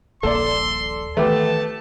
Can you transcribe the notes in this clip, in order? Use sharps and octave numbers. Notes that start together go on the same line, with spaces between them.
D#1 A#1 A#3 A4 D5 C6
D#3 E3 A3 B3 G4 A5